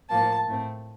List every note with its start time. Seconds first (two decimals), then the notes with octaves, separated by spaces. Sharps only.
0.10 A2 F3 A#3 A5
0.47 A2 A3 C4